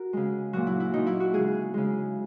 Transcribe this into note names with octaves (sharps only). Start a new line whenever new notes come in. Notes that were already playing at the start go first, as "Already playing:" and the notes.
Already playing: F#4 A#4
C#3 G#3
A#2 F#3 F#4
E4
E4
A#2 F#3 D#4
E4
F#4
C#3 G#3 G#4
C#3 G#3